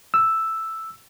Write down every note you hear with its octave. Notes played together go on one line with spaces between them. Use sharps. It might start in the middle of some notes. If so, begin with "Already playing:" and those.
E6